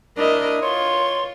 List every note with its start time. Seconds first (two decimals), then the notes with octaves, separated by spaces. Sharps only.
0.17 D4 E4 A#4 D#5
0.62 F4 C#5 C6